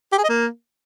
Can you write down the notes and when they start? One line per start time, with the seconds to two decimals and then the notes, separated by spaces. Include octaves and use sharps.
0.12 G4
0.18 G#4
0.23 D#5
0.29 A#3